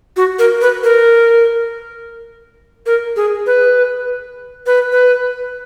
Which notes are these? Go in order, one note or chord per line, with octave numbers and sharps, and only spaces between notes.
F#4
A#4
B4
A#4
A#4
G#4
B4
B4
B4